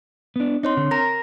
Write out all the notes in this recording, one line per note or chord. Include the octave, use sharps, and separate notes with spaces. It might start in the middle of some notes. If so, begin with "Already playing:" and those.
B3 D4
C4 D#4 C#5 C6
D3
A#4 A#5 A#6